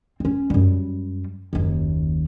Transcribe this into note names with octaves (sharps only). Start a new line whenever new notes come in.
C4 C#4
F#2 G3
F#1 D#2